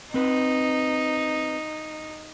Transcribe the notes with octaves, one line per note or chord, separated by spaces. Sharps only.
C4 D#4 B4